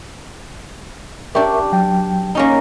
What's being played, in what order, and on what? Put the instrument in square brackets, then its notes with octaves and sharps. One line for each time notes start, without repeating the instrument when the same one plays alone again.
[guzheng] D4 G4 [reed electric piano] A#4 E5 C#6
[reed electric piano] F#3 G5
[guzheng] A#3 C#4 D#4